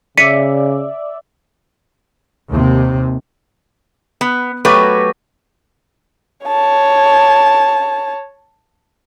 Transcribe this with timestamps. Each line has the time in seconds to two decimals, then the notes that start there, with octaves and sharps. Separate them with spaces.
0.18 C#3 D5 E5 B6 C#7 D#7
2.49 D#2 C3
4.21 B3
4.65 F#3 A3 F#4 G4 B4
6.46 C#5 A5